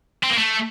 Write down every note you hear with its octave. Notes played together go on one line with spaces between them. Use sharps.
C4
A#3
A3